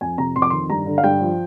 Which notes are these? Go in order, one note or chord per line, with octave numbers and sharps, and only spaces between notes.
F2 G#5
C3 A#5
F2 C6
D6
D#3 C6
G2 A#5
D3
F5
G2 G5
F3